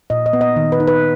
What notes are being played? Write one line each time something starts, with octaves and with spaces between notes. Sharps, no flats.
A#2 D#5
D#5
B3
D#5
D#3
B4
D#4
B4